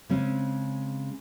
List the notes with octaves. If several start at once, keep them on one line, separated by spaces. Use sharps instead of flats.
C#3 G#3 C4 C#4